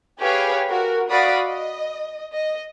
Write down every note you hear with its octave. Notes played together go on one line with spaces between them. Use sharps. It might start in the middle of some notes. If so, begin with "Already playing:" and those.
G4 G#4 B4 C#5 F5 G#5
F#4 A#4
F#4 D5 F5 B5 D#6
D#5
D#5